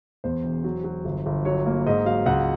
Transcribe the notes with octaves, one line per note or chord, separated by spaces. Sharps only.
E2 C5
E1
F#3
F#3
G1
G1
F#3 C#5
A#3
G#2 D#5
F#3 F5
C#2 F#5